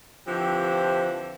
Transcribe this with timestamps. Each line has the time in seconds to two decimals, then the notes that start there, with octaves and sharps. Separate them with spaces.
0.28 D3 E3 F3 C4 G4